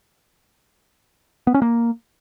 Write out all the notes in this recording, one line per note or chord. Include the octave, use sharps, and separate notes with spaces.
B3
C#4
A#3